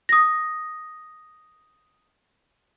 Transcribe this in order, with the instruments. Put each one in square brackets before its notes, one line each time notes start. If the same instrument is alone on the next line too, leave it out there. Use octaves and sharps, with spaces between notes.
[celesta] D#6 A#6